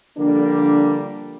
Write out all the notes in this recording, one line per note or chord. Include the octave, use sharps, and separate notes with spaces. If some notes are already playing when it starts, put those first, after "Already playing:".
D3 F3 G3 A#3 D4